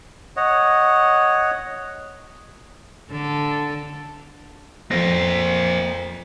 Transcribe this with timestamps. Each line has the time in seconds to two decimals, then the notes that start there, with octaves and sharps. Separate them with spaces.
0.37 C#5 D#5 F#5
3.11 D3 A4
4.91 F2 A#3 C5 A#6